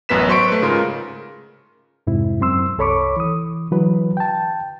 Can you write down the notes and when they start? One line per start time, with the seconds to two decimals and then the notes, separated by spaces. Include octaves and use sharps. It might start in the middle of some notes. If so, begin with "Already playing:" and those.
0.09 A1 F#2 B3 B4 B6 E7
0.28 F#3 C5 C6 C#6 C#7 D7
0.48 A3 B4
0.62 G#2 C#3 F4 A#4 C6
2.07 F2 G#2 C3 E4
2.41 F#2 C4 C6 E6
2.78 C2 A4 C#5 B5 C#6 D6
3.17 E3 D#6
3.71 D3 E3 F#3 B4
4.17 G5 A5